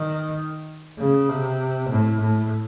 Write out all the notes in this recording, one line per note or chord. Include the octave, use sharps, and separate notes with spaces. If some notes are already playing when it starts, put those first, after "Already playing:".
Already playing: D#3
C#3
C3
A2
A2